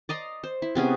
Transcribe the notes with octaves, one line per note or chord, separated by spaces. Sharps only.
D5 D#5 A#5 C6
C5
E4
C3 B3 C#4 G#4